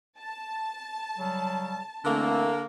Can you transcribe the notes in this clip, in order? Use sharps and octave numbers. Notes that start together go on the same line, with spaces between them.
A5
C#3 F#3 G3
D3 E3 A3 A#3 C4